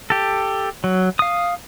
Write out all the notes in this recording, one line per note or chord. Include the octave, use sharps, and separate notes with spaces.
G4 A4
F#3
F5 D#6